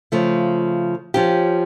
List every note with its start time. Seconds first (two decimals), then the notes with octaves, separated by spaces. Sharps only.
0.12 C#3 F3 A3
1.14 F3 C#4 G4